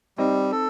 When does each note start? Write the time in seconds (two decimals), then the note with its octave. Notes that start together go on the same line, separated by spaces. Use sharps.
0.18 G3 C4 D#4
0.51 A4